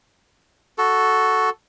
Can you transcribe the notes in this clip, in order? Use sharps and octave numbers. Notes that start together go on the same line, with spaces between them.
F#4 A4